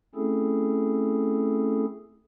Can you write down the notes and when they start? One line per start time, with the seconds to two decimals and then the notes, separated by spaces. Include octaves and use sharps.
0.15 A3 C4 C#4 E4 G#4 A4